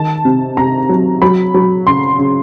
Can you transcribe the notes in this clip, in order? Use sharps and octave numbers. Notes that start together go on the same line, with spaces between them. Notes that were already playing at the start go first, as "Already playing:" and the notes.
Already playing: D#3 A5
C3
C3 A#5
F#3
F#3 B5
F#3
C#3 C6
C#3